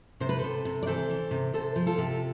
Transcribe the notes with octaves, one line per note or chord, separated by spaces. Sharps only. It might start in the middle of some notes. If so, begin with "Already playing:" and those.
C3 C5
B4
C3 A4 C5
C3
D5
E3 A4 C5
E3
C3
C3 A4 C5
F3
F4 A4
C3